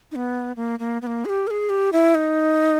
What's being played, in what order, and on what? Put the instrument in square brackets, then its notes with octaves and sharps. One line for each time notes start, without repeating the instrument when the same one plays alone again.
[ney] D#4
B3
A#3
A#3
B3
A#3
G#4
G4
A#4
G#4
G4
E4
D#4